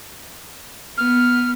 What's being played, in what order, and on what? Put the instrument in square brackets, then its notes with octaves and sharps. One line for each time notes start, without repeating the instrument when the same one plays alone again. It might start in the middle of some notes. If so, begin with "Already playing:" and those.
[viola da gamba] B3 [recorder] F6